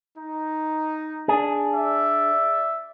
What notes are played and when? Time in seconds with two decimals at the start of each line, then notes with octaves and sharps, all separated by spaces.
0.17 D#4
1.28 D4 G#4
1.74 D5 E5